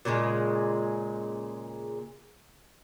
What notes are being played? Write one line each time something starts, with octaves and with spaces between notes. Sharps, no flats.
A#2 C#3 E3 G#3